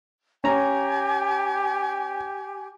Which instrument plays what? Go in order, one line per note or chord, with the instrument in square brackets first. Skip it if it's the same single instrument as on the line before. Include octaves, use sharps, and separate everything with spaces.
[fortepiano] C#4 A#5 [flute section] G4 G#5